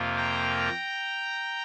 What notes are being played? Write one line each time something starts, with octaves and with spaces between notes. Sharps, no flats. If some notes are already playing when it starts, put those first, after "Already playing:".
Already playing: F2 C3 F3 A#3 F4
G5 A#5